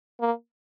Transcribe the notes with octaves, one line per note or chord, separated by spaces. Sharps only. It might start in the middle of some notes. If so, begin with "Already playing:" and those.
A#3